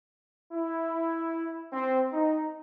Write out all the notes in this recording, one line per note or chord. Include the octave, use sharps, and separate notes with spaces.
E4
C4
D#4